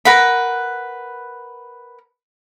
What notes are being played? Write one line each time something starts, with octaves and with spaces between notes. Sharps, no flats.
A#4 B4 F#5 B5